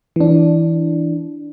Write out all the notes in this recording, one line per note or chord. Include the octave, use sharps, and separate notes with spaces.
E3 D4